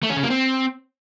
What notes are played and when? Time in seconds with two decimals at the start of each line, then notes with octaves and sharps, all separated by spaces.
0.03 A3
0.10 C#4
0.16 C#3
0.23 A#3
0.30 C4